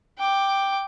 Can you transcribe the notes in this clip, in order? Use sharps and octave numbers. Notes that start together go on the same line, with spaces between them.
G5 D6